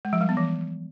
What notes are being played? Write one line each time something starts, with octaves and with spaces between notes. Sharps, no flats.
G#3
F3
G3
B3
E3